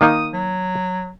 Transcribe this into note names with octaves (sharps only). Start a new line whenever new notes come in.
D#3 A#3 D#4 D#6
F#3